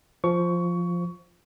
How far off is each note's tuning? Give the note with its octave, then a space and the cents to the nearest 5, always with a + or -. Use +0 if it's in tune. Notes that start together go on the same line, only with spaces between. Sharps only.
F3 +0 C5 +0 C#6 +20